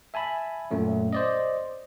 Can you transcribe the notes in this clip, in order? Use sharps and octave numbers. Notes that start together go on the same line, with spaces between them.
E5 G#5 A5 B5
F#2 A#2 A3 C#4
C5 D5 D#5